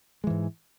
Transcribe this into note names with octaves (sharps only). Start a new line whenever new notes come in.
G#2 E3 G#3